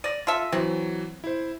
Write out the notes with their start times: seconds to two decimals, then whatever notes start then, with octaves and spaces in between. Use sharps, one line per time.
0.04 D5 A#6 D#7
0.27 F4 A4 E5
0.52 E3 F#3 C4
1.24 E4 C5